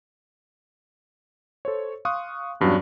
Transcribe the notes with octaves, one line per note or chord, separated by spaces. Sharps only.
A4 C5 C#5
F5 C6 C#6 D#6 F#6
E2 G2 F#3 C#4 F#4 D5